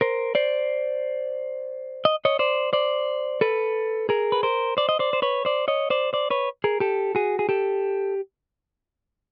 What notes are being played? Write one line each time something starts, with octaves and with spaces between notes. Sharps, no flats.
A#4 C5
C5 D5
D#5
C#5 D#5
C5 D5
C5 D5
A4 B4
G#4 A#4
B4
A#4 C5
C5 D5
D#5
C5 D5
C5
B4 C#5
C5 D5
C#5 D#5
C5 D5
C5 D5
B4 C#5
G#4 A#4
G4 A4
F#4 G#4
G#4
G4 A4